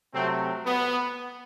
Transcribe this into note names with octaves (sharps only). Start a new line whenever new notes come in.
C3 F#3 A3 C4
B3